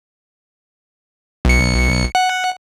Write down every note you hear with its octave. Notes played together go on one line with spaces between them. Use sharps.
B1 C#7
F#5